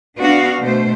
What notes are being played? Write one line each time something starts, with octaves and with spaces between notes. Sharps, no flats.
B3 D4 F#4 F5
B2 A3 C5